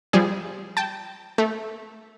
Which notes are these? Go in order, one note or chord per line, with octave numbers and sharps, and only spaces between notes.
F3 G3 G#4
G5 A5
A3